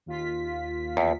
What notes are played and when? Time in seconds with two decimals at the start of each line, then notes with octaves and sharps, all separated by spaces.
0.06 D#2 F4 B6
0.97 E2